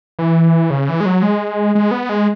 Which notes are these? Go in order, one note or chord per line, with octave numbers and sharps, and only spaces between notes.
E3
C#3
E3
G#3
F#3
G#3
G#3
B3
G#3